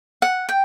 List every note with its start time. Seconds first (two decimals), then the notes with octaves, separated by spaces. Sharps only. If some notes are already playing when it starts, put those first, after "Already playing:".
0.22 F#5
0.49 G5